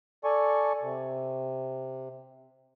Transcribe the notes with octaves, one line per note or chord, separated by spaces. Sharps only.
A4 D5 G#5 C#6
C3